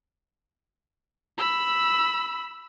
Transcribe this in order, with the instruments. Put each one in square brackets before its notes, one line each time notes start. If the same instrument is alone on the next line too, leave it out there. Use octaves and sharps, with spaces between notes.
[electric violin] B5 E6